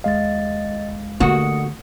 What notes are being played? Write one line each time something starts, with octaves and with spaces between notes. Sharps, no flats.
D#2 G#3 D#5 F5 A6
D3 A3 A#3 F#4 D#6 C#7